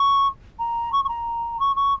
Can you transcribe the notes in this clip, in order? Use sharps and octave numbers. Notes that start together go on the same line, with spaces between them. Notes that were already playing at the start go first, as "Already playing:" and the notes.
Already playing: C#6
A#5
C#6
C#6
A#5
C#6
C#6